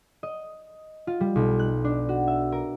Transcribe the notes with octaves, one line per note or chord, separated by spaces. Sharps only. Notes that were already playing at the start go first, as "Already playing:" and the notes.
D#5
F4
G3
B1
F#6
D4
F#4
E5
A#4